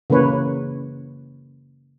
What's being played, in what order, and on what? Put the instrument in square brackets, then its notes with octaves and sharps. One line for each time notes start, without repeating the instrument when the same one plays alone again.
[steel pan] C#3 E3 A#3 B4 C#5